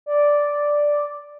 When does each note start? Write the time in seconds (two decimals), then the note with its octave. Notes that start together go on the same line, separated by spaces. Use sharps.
0.06 D5